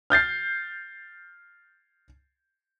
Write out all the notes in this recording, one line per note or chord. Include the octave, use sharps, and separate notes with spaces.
F6 G6 A6 C7